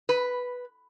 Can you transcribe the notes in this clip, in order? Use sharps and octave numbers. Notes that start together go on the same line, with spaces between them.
B4